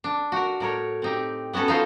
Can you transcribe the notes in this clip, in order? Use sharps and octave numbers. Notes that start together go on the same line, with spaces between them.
D4
F#4 A#4
A2 A#4 C#5
C4 D#4 G4
B3 C#4 F#4 A4 B4
D#4 F4 A4 C5